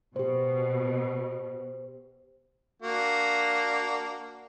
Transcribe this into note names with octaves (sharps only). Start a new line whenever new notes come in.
B2 G4 C5
A#3 D4 F#4